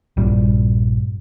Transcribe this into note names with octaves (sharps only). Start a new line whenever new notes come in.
A#1 G2 G3